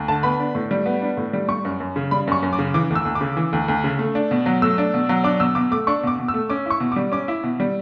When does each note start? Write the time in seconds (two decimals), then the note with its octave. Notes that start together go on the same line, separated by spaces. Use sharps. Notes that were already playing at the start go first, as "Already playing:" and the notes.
Already playing: D2
0.08 D3 A5
0.23 B3 B5
0.40 D4
0.55 A2
0.71 G3
0.86 B3
1.02 D4
1.17 A2
1.33 G3
1.49 G3 C#6
1.65 F#2
1.80 F#2
1.96 C#3
2.11 G3 B5
2.27 F#2 C#6
2.43 F#2
2.53 D6
2.59 C#3
2.74 E3 D6
2.90 D2
2.95 E6
3.05 D2
3.15 D6
3.21 C#3
3.37 E3
3.53 D2
3.68 D2
3.84 C#3
3.99 A3
4.15 D4
4.31 B2
4.46 F#3
4.62 A3 E6
4.78 D4
4.94 B2
5.09 F#3
5.24 D4 D6
5.40 B2 E6
5.55 B2 D6
5.71 A3 D6
5.87 D4 C#6
6.03 B2 D6
6.19 B2
6.28 E6
6.34 A3
6.50 C#4 D6
6.66 E4 C#6
6.80 B2
6.92 D6
6.96 G3
7.12 C#4 D6
7.28 E4
7.44 B2
7.60 G3